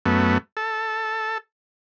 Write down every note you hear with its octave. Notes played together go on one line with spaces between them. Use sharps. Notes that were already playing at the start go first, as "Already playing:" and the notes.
F#2 A3 B3
A4